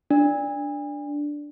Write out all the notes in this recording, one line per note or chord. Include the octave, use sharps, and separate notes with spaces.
D4